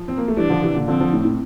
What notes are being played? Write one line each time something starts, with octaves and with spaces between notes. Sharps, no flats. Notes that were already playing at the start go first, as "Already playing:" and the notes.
Already playing: F3
C4
A#3
A3
E3 G3 D4
D3 F3
C3 E3
A#2 D3
D3 F3 C4
D3 F3
A2
A2